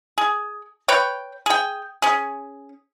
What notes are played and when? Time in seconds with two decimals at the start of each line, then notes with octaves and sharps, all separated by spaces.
0.18 G#4
0.88 B4 C#5 G5
1.46 G#4 G5
2.02 C#4 G#4